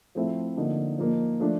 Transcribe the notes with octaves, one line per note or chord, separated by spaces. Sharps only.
F3 A3 C4 E4
D3 F3 A#3 D#4
F3 A#3 D#4
F3 A3 D4